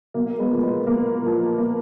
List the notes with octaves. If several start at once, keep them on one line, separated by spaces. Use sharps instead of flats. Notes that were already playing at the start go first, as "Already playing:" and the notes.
B1 A#3
G#3 B3
A#2 F3
G#3 B3
B1 A#3
A#2 F3
A#3